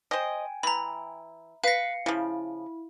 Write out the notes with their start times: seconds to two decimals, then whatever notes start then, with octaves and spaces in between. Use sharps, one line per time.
0.11 C5 D#5 G5 G#5
0.63 E3 A#5 B5
1.64 B4 F5 A#6 C7 C#7
2.06 C#3 F3 E4